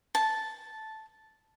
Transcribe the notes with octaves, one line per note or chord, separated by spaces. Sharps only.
A5